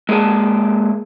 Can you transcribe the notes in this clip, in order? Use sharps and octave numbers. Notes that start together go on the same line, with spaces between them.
G#3 A#3 G#4 D5 A5